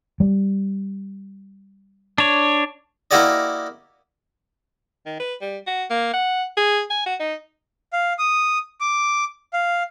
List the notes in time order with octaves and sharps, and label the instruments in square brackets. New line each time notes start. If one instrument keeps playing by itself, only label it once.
[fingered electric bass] G3
[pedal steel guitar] D4 C#5
[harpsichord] A#3 E4 F#4 G4 D5 D#5
[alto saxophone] D#3
B4
G3
F#4
A#3
F#5
G#4
G#5
F#4
D#4
[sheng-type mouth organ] F5
D#6
D6
F5